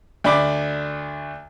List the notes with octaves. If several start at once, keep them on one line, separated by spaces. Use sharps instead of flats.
D2 D4 B5 D6